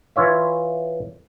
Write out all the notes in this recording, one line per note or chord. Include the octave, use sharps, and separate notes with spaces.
E3 F4 C#5 E5